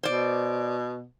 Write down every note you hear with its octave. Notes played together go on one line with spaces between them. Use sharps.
B2 C5 D5